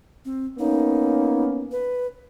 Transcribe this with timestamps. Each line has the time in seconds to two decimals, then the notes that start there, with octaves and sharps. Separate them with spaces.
0.25 C4
0.59 A#3 B3 C#4 D#4
1.72 B4